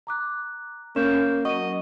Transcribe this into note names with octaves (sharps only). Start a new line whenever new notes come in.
A#5 D6 F#6
A#3 C#4 G6 E7
F#3 D#5 C#6 D#7